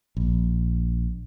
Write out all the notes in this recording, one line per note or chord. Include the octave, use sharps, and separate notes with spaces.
A#1